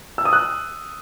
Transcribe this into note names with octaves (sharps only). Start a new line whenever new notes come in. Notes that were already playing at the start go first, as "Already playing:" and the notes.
E6
D#6
F#6